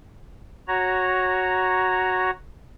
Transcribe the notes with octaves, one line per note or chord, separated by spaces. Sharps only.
F#4 C#5 A#5